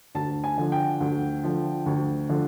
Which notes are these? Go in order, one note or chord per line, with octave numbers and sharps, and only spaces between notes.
D2 A5
G#5
D3 F3
G5
D2
D3 F3
D2
D3 F3